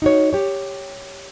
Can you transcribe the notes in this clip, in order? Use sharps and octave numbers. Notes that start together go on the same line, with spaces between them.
D#4 F#4 C#5
G4 C#5